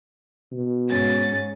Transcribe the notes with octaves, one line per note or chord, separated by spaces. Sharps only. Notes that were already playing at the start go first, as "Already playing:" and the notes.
B2
G#2 C#4 A6